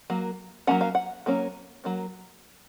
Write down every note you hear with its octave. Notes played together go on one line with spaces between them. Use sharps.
F#3 A#3
F#3 A#3 C#4 F#5
F5
F#5
F#3 A#3 C#4
F#3 A#3 C#4